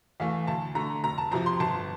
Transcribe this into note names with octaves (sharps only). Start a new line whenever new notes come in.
E2 E3 A3 F5
D2 A5
D3 A3 A#5
F1 A#5
A5
F2 C3 F3 A#5
C6
G1 A5